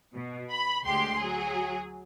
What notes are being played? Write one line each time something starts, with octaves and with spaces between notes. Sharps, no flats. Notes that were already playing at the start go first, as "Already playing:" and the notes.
B2
B5
D2 G#3 G4 C6
F#3 G#4